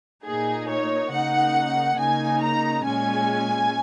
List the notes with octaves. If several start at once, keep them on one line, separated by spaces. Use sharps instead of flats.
A#2 A#3 D#4 G#4
C#5
C#3 A#3 D#4 F#5
C#3 A#3 D#4 G#5
A#5
A#2 G#3 C#4 G#5